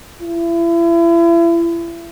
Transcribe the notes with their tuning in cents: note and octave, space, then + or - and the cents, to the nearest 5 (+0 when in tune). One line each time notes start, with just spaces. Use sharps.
E4 +35